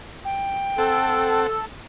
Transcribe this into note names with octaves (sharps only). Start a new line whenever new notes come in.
G5
C4 A4 F#5 A5